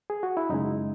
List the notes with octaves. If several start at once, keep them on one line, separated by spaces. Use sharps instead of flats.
G#4
F#4
E4
F#2 C#3 G#3 D#4